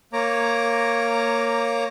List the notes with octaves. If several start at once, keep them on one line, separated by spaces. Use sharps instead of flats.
A#3 C#5 A#5 D6